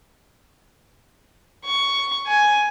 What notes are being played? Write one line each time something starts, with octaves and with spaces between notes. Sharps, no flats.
C#6
G#5